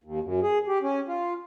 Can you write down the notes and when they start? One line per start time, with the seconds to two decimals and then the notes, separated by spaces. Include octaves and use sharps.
0.04 D#2
0.23 F#2
0.43 G#4
0.68 G4
0.83 C#4
1.08 F4